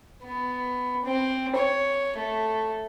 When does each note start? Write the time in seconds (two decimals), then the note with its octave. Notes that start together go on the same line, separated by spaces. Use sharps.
0.24 B3
1.06 C4
1.55 C#5
2.17 A3